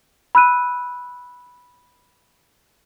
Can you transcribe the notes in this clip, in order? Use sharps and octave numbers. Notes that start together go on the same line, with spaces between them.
B5 E6 F#6 D#7